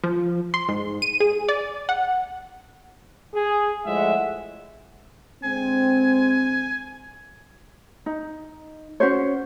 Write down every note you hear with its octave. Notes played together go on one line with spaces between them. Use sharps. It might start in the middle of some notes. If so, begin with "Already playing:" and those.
F3
C6
G#2
D#7
G#4
D5
F#5
G#4
A2 F3 G#3 E5 F#5
D3 G#3 C4 G#5
D#4
C#4 F#4 C5 C#5